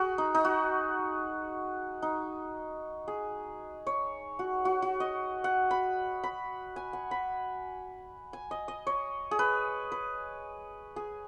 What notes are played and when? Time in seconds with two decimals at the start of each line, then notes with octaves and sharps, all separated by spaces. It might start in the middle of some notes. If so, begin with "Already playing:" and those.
Already playing: F#4 G#4
0.18 D#4
0.35 D#4
0.45 F#4
2.02 D#4
3.08 G#4
3.87 C#5
4.39 F#4
4.65 F#4
4.82 F#4
5.00 D#5
5.44 F#5
5.71 B5
6.24 B5
6.76 G#5
6.93 F#5
7.11 B5
8.33 G#5
8.51 D#5
8.68 D#5
8.87 C#5
9.31 G#4
9.39 B4
9.92 B4
10.96 G#4